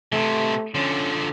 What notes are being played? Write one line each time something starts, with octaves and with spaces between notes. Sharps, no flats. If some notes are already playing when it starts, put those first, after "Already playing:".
C3 E3 A3
D3 F3 C#4